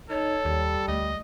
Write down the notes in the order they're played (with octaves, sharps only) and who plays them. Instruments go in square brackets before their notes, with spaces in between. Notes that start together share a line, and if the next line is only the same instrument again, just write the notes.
[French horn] D#4 [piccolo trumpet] A4 [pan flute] C#5
[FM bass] D#2 [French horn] G3
[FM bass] D2 [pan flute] A3 [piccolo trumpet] D#5